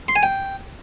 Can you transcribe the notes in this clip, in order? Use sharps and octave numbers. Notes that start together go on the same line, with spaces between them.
C6
G#5
G5